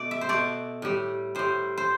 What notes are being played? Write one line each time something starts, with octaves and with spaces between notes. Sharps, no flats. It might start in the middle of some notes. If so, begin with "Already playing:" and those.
Already playing: B2 A3 D5
E5
C5
B2 A3 D5
A2 G3
A2 G3 C5
C5